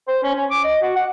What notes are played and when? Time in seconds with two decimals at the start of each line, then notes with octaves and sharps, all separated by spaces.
0.08 C5
0.23 C#4
0.35 C#4
0.50 D6
0.64 D#5
0.82 F#4
0.96 F#5